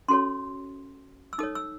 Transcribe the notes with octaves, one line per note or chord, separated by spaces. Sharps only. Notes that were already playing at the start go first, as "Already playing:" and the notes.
C#4 F#4 A4 C#5 C6
E6
D#4 A4 C#5 D#6
E6